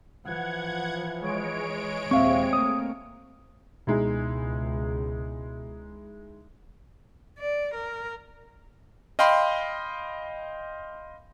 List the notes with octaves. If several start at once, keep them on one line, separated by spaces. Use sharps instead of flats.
E3 F3 F#5 G#6
G#3 C#5 D7
D#2 A#2 C4 E5 F5 C#6
A3 A#3 D#6
C#2 B2 G#3 D#4 E4
D5
A#4
D#5 F5 G5 B5 C6